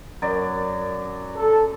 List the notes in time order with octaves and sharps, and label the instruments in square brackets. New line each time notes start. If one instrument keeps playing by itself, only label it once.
[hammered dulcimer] F#2 F#3 D5
[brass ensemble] A4